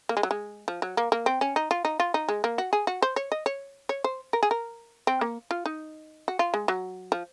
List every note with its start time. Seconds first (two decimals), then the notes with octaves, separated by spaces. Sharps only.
0.09 A#3
0.17 G#3
0.23 F#3
0.31 G#3
0.68 F3
0.82 F#3
0.97 A#3
1.12 A#3
1.26 C4
1.41 C#4
1.56 D#4
1.71 F4
1.85 D#4
2.00 F4
2.14 D#4
2.29 G#3
2.44 A#3
2.58 F#4
2.73 G#4
2.87 F#4
3.02 C5
3.16 C#5
3.32 D#5
3.46 C#5
3.89 C#5
4.04 C5
4.33 A#4
4.43 G#4
4.51 A#4
5.07 C4
5.21 A#3
5.51 F4
5.66 D#4
6.28 F#4
6.39 F4
6.54 G#3
6.68 F#3
7.12 F3